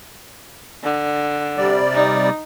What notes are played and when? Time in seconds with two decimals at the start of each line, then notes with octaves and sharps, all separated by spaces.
0.83 D3
1.58 C3 G3 D5
1.92 D#4